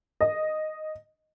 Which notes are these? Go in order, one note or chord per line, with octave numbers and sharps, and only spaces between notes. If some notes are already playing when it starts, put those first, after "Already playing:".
D#5